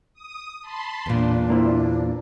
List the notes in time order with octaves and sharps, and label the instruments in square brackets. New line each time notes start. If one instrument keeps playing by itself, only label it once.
[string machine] D#6
A5 B5 C6
[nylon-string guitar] E2 A#2 [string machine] D4
[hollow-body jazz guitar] A#3 E4 C5